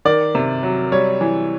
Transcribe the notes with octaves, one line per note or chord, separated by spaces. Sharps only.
D#3 D5
C3
F#3
G3 C#5
E3